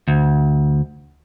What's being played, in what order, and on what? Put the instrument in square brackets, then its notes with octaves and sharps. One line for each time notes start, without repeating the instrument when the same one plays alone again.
[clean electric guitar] D2